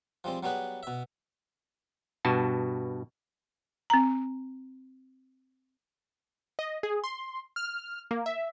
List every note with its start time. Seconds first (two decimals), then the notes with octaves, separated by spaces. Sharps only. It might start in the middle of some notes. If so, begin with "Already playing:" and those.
0.24 F3 G3 G#3 C4
0.43 F#3 G3 B3 G#4 B4
0.83 B2 E5
2.25 G2 B2 F#4 A5
3.90 C4 A#5
6.59 D#5
6.83 G#4
7.04 C6
7.56 F6
8.11 A#3
8.26 E5